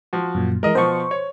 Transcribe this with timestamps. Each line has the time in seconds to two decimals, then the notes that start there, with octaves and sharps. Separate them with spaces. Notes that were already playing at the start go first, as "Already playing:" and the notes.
0.13 F3 F#4
0.35 F#2 A#2
0.63 E3 G#3 A#4 D#5
0.75 B2 F3 C5 C#6
1.11 C#5